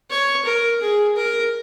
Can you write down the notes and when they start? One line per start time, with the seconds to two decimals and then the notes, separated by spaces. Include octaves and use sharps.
0.10 C#5
0.45 A#4
0.81 G#4
1.17 A#4